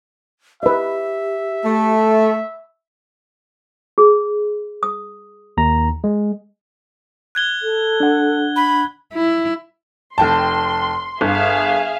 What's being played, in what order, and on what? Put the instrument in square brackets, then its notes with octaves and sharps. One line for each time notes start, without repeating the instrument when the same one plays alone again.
[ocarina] G4 [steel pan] B4 D#5 [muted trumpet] E5
[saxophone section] A3
[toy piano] G#4
D#6
[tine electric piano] D#2 A#5
G#3
[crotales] F#6 G#6 G7
[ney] A4
[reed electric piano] D4 F#5
[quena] B5
[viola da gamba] E4
[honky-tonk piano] F1 G5 A5 [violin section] C6
[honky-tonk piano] G1 [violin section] G#4 E5 F5